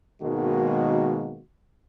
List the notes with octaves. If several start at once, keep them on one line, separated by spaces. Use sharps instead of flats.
G#1 B2 D#3 G#3 A#3 F#4